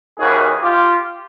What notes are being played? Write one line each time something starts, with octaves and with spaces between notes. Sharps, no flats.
D#2 C#3 E3 F#4 G#4
F4 G4